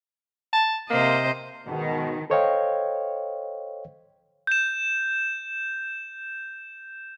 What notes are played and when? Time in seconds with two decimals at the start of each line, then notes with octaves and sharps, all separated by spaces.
0.53 A5
0.90 C3 A#3 C5 D#5
1.67 G#2 B2 D#3
2.30 A4 C5 C#5 D#5 F5 G5
4.47 G6 E7